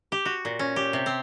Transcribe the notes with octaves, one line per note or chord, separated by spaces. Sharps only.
G4
F#4
A#2
C#4
G4
C3
C4